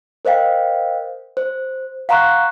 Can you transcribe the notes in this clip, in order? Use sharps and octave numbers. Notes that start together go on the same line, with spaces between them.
A#4 C5 D#5 F5 G5
C5
F5 F#5 A#5 C6 C#6 F#6